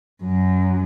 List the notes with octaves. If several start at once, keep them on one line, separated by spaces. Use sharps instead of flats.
F#2